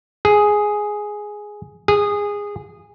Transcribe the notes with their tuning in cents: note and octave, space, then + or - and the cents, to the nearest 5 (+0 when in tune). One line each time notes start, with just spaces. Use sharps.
G#4 +5
G#4 -15